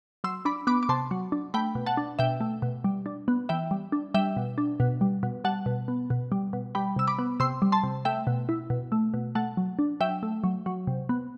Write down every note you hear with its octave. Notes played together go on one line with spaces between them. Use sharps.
F#3 C6 E6
D4 B5 D6
B3 B5 D6
D6
C3 A5 C6
F#3
D4
A3 G5 B5
B2
F#5 A5
D4
B2 E5 G5
A3
B2
G3
D4
B3
E3 E5 G5
G3
D4
G3 E5 G5
B2
D4
B2
G3
B2
G3 F#5 A5
B2
B3
B2
G3
B2
G3 G5 B5
C3 E6
B5 D6
B3
C3 C6 E6
G3
A5 C6
C3
A3 E5 G5
B2
E4
B2
A3
B2
A3 F#5 A5
F#3
D4
F#3 E5 G5
A3
F#3
F#3
C3
B3